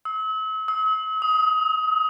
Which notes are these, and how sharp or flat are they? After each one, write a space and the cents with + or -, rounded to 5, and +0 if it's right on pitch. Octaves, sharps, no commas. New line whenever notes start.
E6 -40
E6 -45
D#6 +25